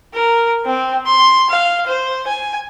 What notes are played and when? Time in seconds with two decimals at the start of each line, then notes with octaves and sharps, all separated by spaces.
0.14 A#4
0.65 C4
1.06 C6
1.50 F5
1.86 C5
2.28 G#5